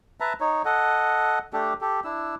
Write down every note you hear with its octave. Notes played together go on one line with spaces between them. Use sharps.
B4 E5 A5 A#5
D#4 C#5
A4 D#5 F#5
A3 D4 G4 A4
G4 A4
D4 E4 E6